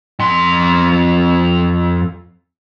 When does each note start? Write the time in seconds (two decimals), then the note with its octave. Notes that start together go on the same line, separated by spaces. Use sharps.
0.20 F2 C6